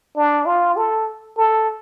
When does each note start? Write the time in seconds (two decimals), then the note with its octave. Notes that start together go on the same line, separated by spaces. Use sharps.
0.17 D4
0.46 F4
0.77 A4
1.37 A4